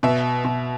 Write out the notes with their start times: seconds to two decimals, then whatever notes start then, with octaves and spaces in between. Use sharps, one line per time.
0.03 B2 E5
0.44 B2